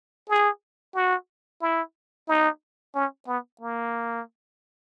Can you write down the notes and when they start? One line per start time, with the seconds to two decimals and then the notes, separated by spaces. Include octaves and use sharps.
0.29 G#4
0.95 F#4
1.62 E4
2.28 D#4
2.95 C#4
3.27 B3
3.61 A#3